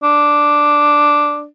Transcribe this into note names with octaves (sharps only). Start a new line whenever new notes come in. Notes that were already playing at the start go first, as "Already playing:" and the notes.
D4